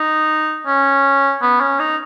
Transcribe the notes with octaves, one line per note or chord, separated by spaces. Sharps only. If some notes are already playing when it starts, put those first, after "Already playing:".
Already playing: D#4
C#4
B3
C#4
D#4